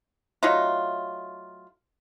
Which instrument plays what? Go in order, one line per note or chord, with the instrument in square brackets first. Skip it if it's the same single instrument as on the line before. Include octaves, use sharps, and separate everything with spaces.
[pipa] F#3 A3 D#4 F4